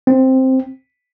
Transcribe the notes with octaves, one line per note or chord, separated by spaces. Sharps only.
C4